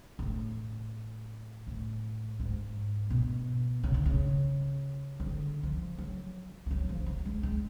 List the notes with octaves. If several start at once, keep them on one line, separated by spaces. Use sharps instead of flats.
G#2
A2
A2
G#2
B2
C#3
D3
C#3
F3
D3
F3
F#3
F3
F#3
F3
F#3
G#3
G#3